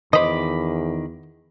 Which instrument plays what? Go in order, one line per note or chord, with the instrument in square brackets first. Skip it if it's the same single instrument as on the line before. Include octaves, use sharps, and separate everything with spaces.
[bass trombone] E2 [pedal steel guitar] D#3 B5 D6 [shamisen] C5 D#5